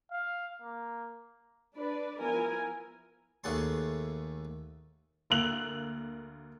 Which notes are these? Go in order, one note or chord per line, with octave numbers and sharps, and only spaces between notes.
F5
A#3
D4 B4 D5
F3 B3 E4 A#4 G#5
D#2 A3 G#4 F#5 A5 C6
D2 A#3 E6 F#6 F7 F#7